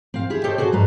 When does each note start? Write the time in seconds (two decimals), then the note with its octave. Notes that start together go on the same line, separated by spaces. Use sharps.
0.14 C4 F5
0.30 E4 G4 G#4
0.44 G4 A4 C5 C#5 D#5 G5
0.58 F#4 G#4 A4 C5
0.72 G2 G#3 B4 A#5